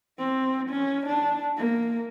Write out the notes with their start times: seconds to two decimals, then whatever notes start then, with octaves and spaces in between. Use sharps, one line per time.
0.18 C4
0.70 C#4
1.06 D4
1.58 A#3